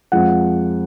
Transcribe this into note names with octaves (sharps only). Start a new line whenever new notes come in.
F2 F3 G#3 F#5